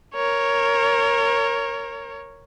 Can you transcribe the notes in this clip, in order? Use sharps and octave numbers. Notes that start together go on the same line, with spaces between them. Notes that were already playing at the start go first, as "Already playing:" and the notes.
A#4 C#5